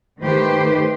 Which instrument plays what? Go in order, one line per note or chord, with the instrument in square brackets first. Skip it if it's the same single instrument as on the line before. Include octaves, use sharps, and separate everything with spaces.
[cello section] D#3 A3 G4 B4 C5